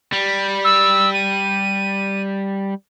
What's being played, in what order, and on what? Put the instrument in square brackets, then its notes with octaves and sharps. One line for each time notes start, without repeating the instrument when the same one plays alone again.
[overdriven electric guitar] G3
[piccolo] E6
D#7